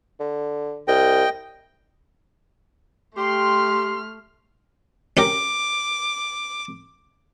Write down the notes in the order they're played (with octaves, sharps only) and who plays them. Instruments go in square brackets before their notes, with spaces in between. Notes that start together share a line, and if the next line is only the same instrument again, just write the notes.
[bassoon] D3
[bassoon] C2 [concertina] D#5 G5
[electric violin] A3 F6 [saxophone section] G4 [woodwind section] C6
[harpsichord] C#4 G4 A#4 [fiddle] D6